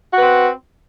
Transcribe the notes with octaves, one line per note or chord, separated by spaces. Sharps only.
C4 F#4 B4